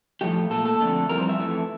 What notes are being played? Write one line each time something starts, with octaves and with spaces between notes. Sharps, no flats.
A2 F3 A3 G4
A#2 A3 A4
A4
F2 D3 A3
F2 E3 G3 A#4
C5
E5
F2 E3 A3